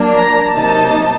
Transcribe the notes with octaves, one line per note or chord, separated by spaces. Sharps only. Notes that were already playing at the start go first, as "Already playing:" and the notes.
Already playing: F#3 A#3 D4
A#5
C3 F#3 A#3 D#4 A5